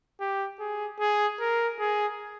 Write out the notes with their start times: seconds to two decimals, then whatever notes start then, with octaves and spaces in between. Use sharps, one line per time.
0.20 G4
0.60 G#4
1.00 G#4
1.40 A#4
1.79 G#4